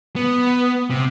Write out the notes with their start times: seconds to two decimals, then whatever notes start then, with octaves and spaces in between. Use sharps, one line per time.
0.16 B3
0.90 C3